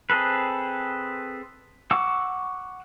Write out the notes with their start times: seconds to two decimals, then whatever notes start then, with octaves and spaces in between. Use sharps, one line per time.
0.10 C4 G#4 A4 B4
1.91 F#5 C#6 D6 E6